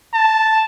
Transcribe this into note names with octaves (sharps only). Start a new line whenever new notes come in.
A5